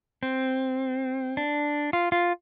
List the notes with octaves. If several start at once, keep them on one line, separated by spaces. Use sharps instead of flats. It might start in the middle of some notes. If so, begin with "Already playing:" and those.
C4
D4
F4
F4